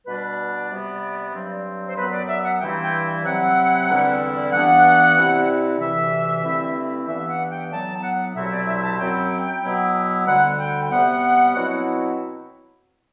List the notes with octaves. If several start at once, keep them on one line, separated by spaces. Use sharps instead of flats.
B2 G3 D4 B4
D5
C3 G3 B3
G2 F#3 C4
C5
F#2 F#3 B3 B4
D5
E5
F#5
G2 E3 G3 C4 E4 G5
G5
C3 F#3 C4 E4 F#5
E2 D3 G3 C4 E4
G2 E3 B3 D4 F#5
C3 G3 C4 E4
D2 C3 E3 E5
G2 D3 A3 C4 E4
G2 E3 B3 E5
F#5
G5
A2 F#3 B3 A5
F#5
C2 B2 F#3 C4 E4 E5
D5
E5
A5
F#2 F#3 C4 E4 G5
B2 F#3 B3 E4
D2 D3 G3 F#5
G5
C3 G3 B3 F#5
B2 F#3 C4 E4